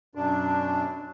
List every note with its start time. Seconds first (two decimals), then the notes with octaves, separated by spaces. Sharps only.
0.15 F#2 B2 D4